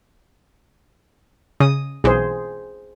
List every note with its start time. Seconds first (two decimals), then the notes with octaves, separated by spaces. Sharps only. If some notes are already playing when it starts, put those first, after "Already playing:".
1.60 C#3 D#6
2.04 B1 E3 G#4 C5